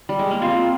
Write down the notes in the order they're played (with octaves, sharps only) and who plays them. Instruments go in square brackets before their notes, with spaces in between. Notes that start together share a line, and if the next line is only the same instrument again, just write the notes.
[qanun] G3
G#3
A#3
[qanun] C4 [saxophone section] F4